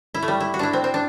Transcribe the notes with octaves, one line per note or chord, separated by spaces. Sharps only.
E4
A3
G3
E4
F#4
D4 E4
C4
C4
D4